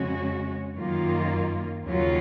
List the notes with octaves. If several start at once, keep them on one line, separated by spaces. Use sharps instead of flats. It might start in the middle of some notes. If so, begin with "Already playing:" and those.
Already playing: F2 C#3 G#3 C#4 F#4
F#2 D#3 A#3 F4
D#2 C#3 F#3 C#4 F4